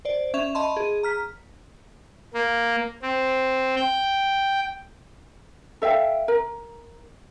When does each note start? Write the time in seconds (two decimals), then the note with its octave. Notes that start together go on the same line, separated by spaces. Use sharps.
0.05 C5 D5
0.34 C#4 E5 C#6 E7 F7
0.55 D#5 A5 B5 C6
0.77 G#4
1.03 A#5 F6 B6
2.34 A#3
3.02 C4
3.76 G5
5.82 A4 E5 F5 G5
6.28 A#4